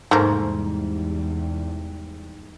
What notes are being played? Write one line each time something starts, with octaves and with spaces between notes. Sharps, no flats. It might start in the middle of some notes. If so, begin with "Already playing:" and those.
E2 G#2 C3 G3 A3 A#3 A#4